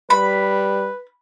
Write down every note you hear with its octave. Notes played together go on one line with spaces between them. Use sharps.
G3 B4 B5